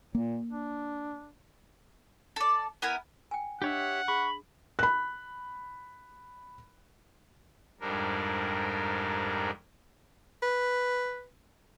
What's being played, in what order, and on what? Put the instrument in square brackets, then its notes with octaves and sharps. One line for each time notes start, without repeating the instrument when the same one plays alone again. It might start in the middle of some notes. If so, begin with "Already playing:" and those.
[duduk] A#2 [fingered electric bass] A#3
[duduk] D4
[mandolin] A4 D5
B3 E4 A#4 G#5
[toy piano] G5 G#5
[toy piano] D4 D#5 [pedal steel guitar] G4 C#5 E5 [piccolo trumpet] F#5
[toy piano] G#4 [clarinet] B5 [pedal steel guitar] C#6
[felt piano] B5 F#6
[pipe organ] F2 G#2 G3 D4 A#4
[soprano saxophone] B4